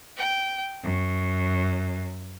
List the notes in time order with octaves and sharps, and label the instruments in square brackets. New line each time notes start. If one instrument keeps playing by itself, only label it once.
[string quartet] G5
F#2